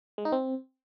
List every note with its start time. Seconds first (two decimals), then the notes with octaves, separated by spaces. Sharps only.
0.18 G#3
0.25 D#4
0.32 C4